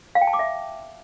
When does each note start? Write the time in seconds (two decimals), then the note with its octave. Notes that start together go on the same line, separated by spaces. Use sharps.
0.15 F5
0.21 G5
0.27 A5
0.33 D6
0.39 E5